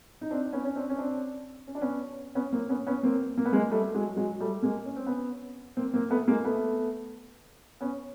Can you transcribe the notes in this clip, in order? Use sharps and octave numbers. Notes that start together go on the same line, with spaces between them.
D#4
C4 D4
B3 C#4
C#4
C4 D4
C#4
C4 D4
C#4
D4
B3 C#4
B3 C#4
A#3 C4
B3 C#4
B3 C#4
A#3 C4
A#3
B3
G#3 A#3
G3 A3
F#3 G#3
F#3 G#3
G3 A3
G#3 A#3
C#4
C4
B3 C#4
A#3 C4
A#3 C4
A3 B3
G#3 A#3
A3 B3
B3 C#4